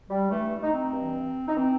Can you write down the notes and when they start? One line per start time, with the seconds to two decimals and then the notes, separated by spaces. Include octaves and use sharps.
0.10 G3
0.30 G2 E3 A3
0.62 D#4
0.72 C4
0.93 G2 E3
1.48 D#4
1.56 E3 C4